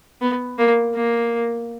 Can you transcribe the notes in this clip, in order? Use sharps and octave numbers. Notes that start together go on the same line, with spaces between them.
B3
A#3
A#3